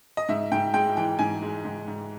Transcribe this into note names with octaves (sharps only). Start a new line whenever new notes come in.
D#5
G#2 E5
G#2 G5
G#3 G5
E3 G5
G#2 G#5
G#3
G#2
G#2